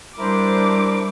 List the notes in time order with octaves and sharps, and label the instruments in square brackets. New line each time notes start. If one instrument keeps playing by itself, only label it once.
[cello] G3 [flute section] D4 C5 [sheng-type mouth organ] E4 A#4 [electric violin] D6